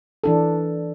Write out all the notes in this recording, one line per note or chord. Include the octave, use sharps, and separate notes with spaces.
E3 D4 A4